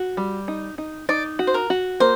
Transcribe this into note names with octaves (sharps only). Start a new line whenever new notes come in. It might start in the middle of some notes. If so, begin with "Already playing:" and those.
Already playing: F#4
G3
D#4
D#4
D#4 D5
F#4
C5
A#4
F#4
A#3 C5